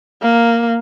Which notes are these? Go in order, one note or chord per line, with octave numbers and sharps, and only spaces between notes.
A#3